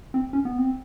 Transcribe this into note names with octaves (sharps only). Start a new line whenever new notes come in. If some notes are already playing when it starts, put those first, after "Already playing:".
C4
C#4
B3
C4